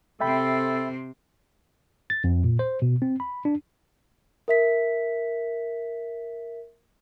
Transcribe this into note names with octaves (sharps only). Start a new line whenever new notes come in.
C3 C4 A4 E5 G5 B5
A6
F2
A#2
C5
B2
C4
B5
D4
A#4 E5 B6